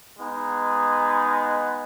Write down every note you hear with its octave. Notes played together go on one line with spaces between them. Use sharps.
G#3 B3 D#4